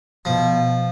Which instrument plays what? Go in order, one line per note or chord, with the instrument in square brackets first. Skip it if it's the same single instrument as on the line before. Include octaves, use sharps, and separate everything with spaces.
[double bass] B2 [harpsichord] F3